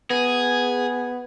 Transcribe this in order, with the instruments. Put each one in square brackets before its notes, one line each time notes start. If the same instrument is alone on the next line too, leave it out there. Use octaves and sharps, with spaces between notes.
[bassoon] B3 [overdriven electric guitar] G#4